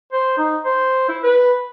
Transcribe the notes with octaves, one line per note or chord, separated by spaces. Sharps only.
C5
D#4
C5
E4
B4